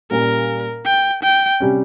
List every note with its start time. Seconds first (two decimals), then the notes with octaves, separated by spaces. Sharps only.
0.11 A#2 G3 C#4 A#4
0.85 G5
1.23 G5
1.60 C3 G3 C#4